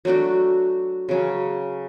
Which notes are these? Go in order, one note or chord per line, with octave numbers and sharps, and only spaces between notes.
F#3 A3 D4 F#4
C#3 F#3 C#4